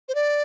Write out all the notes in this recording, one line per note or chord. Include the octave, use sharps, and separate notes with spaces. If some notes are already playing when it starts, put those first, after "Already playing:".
C5
D5